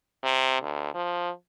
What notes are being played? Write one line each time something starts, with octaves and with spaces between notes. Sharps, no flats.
C3
D2
F3